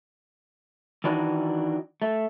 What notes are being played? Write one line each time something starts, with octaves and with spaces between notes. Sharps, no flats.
D#3 E3 D4 D#4 F#4
A3